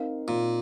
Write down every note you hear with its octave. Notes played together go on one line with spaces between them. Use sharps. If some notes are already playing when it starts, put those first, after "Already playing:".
Already playing: C4 D#4 A#4 F5
A#2